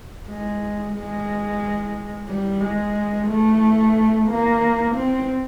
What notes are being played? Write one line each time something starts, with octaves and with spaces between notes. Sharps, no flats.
G#3
G#3
G3
G#3
A3
A#3
C4